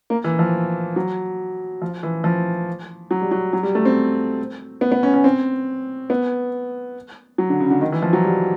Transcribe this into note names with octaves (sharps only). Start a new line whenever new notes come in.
A#3
E3
F3
F#3
F3
E3
F3
F#3
G3
F#3
F#3
G3
A3
C4
B3
B3
C#4
C#4
C4
B3
F#3
D3
C#3
D3
D#3
E3
F3
F#3
G3